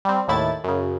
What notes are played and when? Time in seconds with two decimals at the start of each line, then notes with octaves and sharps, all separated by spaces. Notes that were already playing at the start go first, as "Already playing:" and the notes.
0.05 G3 C4
0.28 D#2 A2 E4 A6
0.64 F#2 C#3